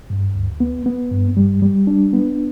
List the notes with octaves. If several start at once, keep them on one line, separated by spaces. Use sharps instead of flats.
G2
D2
B3
B3
G2
G3
G3
D4
B3